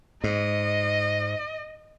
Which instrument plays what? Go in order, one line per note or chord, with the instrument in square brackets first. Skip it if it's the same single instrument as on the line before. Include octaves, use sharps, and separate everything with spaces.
[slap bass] G#2 [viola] D#5